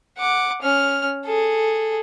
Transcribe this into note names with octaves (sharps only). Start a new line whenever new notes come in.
F#5 D6
C#4 F6
G#4 A4